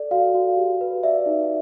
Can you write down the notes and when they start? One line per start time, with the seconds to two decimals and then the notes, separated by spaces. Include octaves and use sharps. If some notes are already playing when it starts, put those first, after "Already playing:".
Already playing: A4 D5
0.11 F#4 F5
0.35 F#4
0.57 G4
0.81 B4
1.03 D5 E5
1.26 D#4